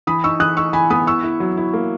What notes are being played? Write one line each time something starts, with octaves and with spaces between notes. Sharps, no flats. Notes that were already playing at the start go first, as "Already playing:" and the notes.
E3 B5 D#6
D#4 C#6 E6
E3 D#6 F#6
D#4 C#6 E6
E3 G#5 B5
B3 B5 D#6
E4 C#6 E6
E4
F#3
E4
A#3